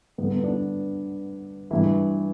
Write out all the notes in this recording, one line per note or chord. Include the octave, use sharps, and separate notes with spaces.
G2 D3 B3
B3
D4
G2 E3 E4